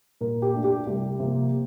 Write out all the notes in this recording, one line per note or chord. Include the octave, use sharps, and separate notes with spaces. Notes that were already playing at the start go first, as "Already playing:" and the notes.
A#2 A#4
G4
A3 D4
G4
C2 G4
C3 F3 A#3